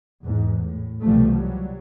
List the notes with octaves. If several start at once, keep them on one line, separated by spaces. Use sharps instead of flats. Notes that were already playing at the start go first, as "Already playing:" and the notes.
E2 G#2
A2
C2 B2 E3 F3 G3 A3
F#3 G3